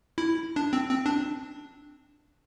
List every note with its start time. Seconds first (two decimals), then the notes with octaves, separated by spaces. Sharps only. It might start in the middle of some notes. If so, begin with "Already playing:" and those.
0.18 E4
0.56 D4
0.73 C4
0.89 C4
1.06 D4